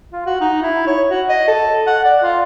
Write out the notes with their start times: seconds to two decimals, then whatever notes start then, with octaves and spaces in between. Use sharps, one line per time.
0.13 F4
0.26 F#4
0.41 D#4
0.62 E4
0.87 C#5
1.10 F#4
1.29 D#5
1.48 A4
1.87 F#5
2.05 D5
2.22 F4